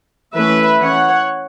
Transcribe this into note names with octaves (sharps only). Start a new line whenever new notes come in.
E3 A3 C#4 B4 E5
E3 C#4 C#5 F#5